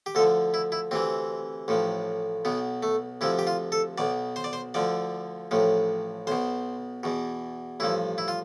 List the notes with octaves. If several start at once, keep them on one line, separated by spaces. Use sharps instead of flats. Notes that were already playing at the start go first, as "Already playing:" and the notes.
G4
D2 D3 F3 A4
E4
E4
D2 C3 E3 C4
A1 A2 F3
B1 B2 B3
A3
D2 C3 F3 E4
G4
F4
A4
B1 B2 D5
C5
D5
C5
D2 D3 F3 D5
A1 A2 F3
B1 B2 C5
E2 B2
A1 G2 F3 E4
E4
F4